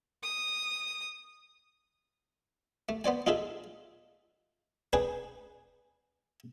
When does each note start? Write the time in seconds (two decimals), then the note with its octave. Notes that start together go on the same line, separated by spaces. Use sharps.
0.23 D#6
2.89 A3
3.04 B3 C5 D5 G#5
3.27 D#4 F4 G#4 A4 E5
4.93 D4 G#4 B4